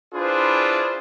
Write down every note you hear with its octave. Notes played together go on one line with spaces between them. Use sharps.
D4 E4 F4 G#4 B4 C5